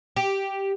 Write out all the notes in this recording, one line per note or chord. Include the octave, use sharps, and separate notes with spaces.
G4